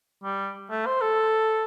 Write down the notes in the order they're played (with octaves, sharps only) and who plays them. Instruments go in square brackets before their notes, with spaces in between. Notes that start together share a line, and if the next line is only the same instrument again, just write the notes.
[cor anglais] G3
A3
C5
A4